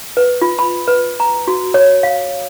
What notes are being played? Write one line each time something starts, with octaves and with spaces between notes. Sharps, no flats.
B4
F4
B5
B4
A#5
F#4
C#5
F5